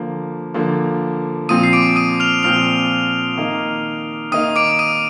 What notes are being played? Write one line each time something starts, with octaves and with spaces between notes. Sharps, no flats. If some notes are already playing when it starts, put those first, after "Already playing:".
Already playing: D3 F3 A#3
D3 F3 A#3
A#2 F3 C4 D#6 D#7
C7
D6 D7
D#6 D#7
F6 F7
A#2 F3 C4 F6 F7
D#3 A#3 D#4
D#3 A#3 D#4 D#6 D#7
D6 D7
D#6 D#7